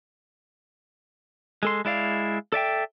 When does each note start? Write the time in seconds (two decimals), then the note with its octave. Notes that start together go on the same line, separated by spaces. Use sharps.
1.63 G#3 A4 C6
1.85 G#3 E4 D5 F5
2.52 A4 D5 E5 G5